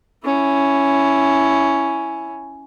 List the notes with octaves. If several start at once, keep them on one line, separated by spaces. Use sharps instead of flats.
C#4 E4